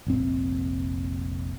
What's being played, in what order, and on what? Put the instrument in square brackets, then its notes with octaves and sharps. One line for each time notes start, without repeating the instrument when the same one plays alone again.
[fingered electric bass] F1 A#1 C4